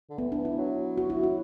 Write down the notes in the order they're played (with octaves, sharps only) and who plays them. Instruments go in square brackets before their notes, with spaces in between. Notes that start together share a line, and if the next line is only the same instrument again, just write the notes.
[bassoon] D3
[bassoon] E3 [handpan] B3
[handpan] D4
[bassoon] E3
[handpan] E4
[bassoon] F#3
[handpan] F#4
E4
F#4